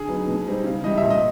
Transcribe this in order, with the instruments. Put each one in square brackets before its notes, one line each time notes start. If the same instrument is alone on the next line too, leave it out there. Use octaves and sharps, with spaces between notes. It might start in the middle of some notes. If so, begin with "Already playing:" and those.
Already playing: [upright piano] D3 G#4
F#3 B3 D#4
B2
G3 C4 D#4
C#3
E3 G3 D#5
A#2 E5
D#5